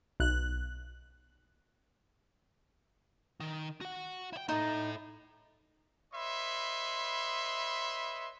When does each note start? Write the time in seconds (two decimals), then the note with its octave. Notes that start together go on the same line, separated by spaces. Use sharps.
0.20 B1 F#6
3.40 D#3
3.81 F#4 F#5
4.33 E4 G5
4.49 D#4 E4 A4
6.14 B4 C#5 D#5 E5 B5 C6